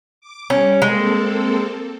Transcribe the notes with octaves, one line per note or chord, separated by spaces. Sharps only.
D6
G3 C#4
G#3 A#3 C4 A4